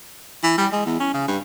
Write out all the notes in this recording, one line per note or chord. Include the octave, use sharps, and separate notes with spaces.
E3
G3
G#3
E2
C#4
C#3
G2